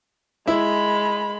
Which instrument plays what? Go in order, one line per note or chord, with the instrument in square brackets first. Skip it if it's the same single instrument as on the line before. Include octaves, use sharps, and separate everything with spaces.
[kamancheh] G#3 B5 [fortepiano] E4